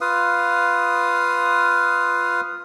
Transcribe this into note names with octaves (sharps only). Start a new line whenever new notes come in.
F4 B4 F5 D#6